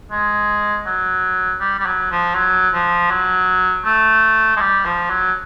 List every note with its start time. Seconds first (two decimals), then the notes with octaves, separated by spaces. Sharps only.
0.11 G#3
0.86 F#3
1.60 G3
1.79 G3
1.86 F#3
2.11 F3
2.35 F#3
2.74 F3
3.10 F#3
3.85 A3
4.56 G#3
4.60 G3
4.85 F3
5.10 F#3